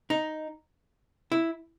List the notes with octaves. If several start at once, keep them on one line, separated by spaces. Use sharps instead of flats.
D#4
E4